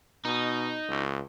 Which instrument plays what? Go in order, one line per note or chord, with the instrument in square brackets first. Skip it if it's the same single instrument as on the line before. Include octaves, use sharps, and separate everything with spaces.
[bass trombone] B2 [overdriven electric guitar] D#4
[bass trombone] C#2